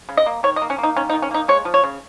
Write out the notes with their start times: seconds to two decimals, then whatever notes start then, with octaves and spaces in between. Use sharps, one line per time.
0.09 C#3
0.17 D#5
0.26 A#3
0.43 D#3 C#5
0.56 D#5
0.62 A#3
0.70 C#4
0.78 A#3
0.83 D#4
0.96 D#3 C#4
1.10 D#4
1.13 D#3
1.22 C#4
1.31 A#3 D#4
1.48 G#3 C#5
1.65 F3
1.74 C#5
1.83 C#3